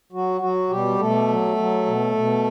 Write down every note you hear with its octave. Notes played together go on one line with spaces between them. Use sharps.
F#3 F#4
F#3 F#4
B2 G3 G4
B2 A3 A4
F#3
F#3
B2
B2